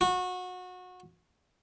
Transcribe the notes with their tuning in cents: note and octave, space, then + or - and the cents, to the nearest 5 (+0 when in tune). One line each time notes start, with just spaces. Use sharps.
F#4 -25